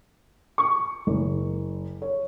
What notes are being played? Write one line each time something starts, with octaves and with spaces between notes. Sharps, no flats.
C#6
F#1
C#5